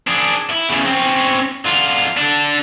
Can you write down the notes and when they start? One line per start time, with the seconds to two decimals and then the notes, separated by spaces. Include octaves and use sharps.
0.07 D4 G#4
0.50 E4
0.69 E2 C#3
0.85 C4 C#4
1.65 D3 F4
2.17 D4 A4